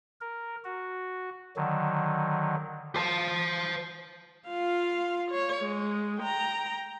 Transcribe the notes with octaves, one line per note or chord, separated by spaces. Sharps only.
A#4
F#4
D3 D#3 F#3
C5 A5
F4 F5
C#5
G#3
G5 A#5